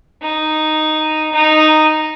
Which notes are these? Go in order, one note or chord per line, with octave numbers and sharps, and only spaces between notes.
D#4
D#4